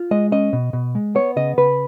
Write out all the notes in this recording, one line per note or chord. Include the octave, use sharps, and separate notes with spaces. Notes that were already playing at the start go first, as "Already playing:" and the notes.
Already playing: F4
G#3 D#5
C#4 D#5
B2
B2
G#3
B3 C#5
C#3 D#5
C#3 B4